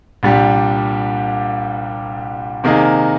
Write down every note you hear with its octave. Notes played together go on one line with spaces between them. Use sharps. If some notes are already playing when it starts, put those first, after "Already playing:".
C2 A#2 G3 D4 G4
C3 D#3 A#3 D#4 G#4